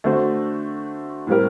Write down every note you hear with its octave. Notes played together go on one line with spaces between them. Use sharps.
D3 A3 D4 F#4 C5
A2 G3 C4 G4 A#4